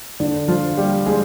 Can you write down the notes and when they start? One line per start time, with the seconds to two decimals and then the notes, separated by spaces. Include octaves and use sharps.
0.20 D3 D4
0.48 F3 F4
0.77 G3 G4
1.06 G#3 G#4